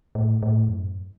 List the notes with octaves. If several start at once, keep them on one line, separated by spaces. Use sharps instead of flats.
A2
A2
F2
F#2